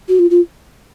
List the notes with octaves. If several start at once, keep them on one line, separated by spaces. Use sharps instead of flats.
F#4
F4
F4